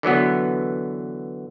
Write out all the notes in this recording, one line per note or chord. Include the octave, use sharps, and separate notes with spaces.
D3 E3 F#3 B3